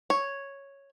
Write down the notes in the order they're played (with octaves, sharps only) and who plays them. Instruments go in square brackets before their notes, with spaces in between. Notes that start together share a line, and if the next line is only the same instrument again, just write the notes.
[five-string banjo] C#5